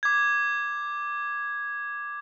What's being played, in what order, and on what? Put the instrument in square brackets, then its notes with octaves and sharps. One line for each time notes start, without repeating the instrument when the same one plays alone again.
[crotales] D6 G#6